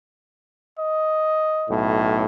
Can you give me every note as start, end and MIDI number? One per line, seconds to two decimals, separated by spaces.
0.79 1.75 75
1.70 2.26 35
1.70 2.26 45